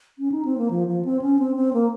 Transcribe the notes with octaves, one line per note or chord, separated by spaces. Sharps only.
C#4
D#4
C4
A#3
F3
F3
C4
C#4
C4
C4
A#3